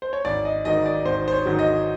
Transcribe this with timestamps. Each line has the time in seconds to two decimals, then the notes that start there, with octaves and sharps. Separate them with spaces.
0.02 C5
0.13 C#5
0.25 G#1 D5
0.45 D#5
0.65 G#2 D#3 F#3 D#5
0.86 D5
1.05 G#1 C5
1.28 C5
1.32 C#5
1.46 G#2 D#3 F#3
1.59 D#5